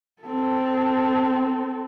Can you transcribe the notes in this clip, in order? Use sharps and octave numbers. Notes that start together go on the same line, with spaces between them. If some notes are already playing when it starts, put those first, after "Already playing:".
C4 A4